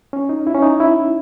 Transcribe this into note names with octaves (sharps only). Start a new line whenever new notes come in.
C#4
D#4
E4
C#4
D#4
E4